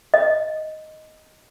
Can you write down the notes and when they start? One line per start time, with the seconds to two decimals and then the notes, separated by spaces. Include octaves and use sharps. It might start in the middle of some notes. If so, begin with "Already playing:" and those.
0.14 D#5